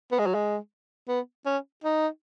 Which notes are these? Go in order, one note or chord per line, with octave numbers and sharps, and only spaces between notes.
B3
G#3
F#3
G#3
B3
C#4
D#4